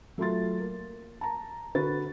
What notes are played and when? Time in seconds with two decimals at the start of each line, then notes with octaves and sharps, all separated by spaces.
0.18 F#3 A3 F4 C6 A6
0.59 A#3
1.21 A5 A#5
1.75 D3 F#4 B4 A6